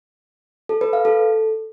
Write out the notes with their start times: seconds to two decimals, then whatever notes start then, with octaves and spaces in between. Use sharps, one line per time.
0.69 A4
0.81 B4
0.93 F5
1.05 A4